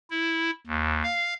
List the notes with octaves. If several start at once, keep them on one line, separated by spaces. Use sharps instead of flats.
E4
D#2
F5